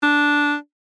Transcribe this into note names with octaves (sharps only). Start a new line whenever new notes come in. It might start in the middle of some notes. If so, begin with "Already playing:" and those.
D4